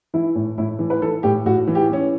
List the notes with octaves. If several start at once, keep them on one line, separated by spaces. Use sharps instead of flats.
E3 E4
A2
A2 E4
E3
B4
E3 A4
A2 G4
A2 F#4
E3
G4
E3 C#4